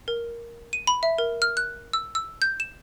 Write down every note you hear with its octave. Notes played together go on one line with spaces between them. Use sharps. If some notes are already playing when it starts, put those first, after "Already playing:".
A#4
D#7
B5
E5
A#4
F6
F#6
E6
E6
G6
E7